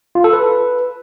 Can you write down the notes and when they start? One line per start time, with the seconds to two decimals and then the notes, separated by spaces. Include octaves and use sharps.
0.15 F4
0.24 A4
0.33 B4